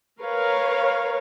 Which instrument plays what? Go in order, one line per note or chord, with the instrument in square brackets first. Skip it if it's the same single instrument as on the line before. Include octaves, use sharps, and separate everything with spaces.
[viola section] A#4 B4 C#5 F5